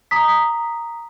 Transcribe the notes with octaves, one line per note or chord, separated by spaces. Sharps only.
A#5 D#6 B6